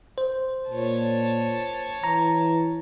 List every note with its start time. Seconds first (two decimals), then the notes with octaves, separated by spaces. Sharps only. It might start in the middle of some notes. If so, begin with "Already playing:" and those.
0.18 C5
0.70 A#2 C#5 A5
2.04 E3 A#5